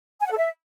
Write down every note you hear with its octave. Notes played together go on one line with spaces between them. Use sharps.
G#5
F#5
A4
E5